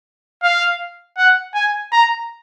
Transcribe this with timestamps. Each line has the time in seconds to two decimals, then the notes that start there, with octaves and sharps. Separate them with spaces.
0.43 F5
1.18 F#5
1.55 G#5
1.92 A#5